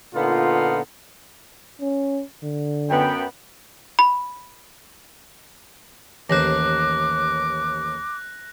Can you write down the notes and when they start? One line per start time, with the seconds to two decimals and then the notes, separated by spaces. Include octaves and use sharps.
0.14 A#2 D3 B3 D#4 F4
1.81 C#4
2.43 D3
2.90 F#2 B3 G5
3.99 B5
6.30 A1 D#2 C5 D6 F#6 A#6